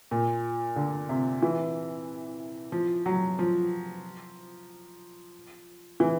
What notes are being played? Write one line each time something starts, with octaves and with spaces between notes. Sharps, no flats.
A#2
D3
C3
E3
F3
F#3
F3
E3